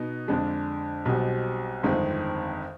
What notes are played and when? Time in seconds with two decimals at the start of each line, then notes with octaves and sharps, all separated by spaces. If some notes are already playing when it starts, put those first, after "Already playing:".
Already playing: B2 B3 D#4
0.28 F2 D3 G#3 D4
1.05 B1 B2 G3 C4
1.83 G1 F2 D#3 G#3 C4